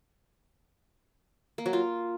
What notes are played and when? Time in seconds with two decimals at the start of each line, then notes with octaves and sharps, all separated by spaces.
1.58 A#3
1.66 F#3
1.73 F4